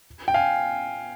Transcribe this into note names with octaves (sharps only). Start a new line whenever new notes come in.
G5
F5 G#5